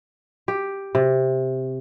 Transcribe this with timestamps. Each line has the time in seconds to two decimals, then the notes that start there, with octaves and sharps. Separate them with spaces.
0.48 G4
0.95 C3